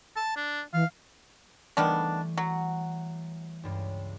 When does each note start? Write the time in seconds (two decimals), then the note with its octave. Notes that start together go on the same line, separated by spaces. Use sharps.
0.16 A5
0.36 D4
0.73 E3 F5
1.77 D#3 E3 G3 A3 B3 D4
2.38 F#3 F#5
3.63 C#2 G2